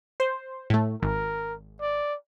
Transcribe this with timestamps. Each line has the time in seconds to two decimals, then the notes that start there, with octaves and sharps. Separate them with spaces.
0.20 C5
0.70 A2 A3
1.03 G#1 A#4
1.81 D5